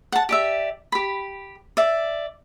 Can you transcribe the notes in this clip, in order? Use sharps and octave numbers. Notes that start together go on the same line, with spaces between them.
F#5 A5
G4 D5 E5
G4 B5
D5 E5